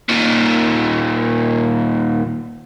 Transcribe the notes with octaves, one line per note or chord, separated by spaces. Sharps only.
D#2 A#2